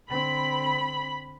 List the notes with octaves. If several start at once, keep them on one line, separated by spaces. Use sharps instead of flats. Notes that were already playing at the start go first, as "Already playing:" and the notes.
D3 C4 B5